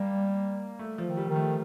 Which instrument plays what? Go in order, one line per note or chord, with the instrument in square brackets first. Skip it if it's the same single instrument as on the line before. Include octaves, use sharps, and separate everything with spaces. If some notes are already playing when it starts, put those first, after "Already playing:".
Already playing: [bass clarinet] G3 [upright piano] A#3
[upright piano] A3
F3
[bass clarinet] D#3
[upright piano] G3
[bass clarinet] D#3
[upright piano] A3